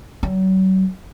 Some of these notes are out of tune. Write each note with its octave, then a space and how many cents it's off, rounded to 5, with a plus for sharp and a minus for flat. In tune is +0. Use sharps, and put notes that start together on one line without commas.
F#3 +35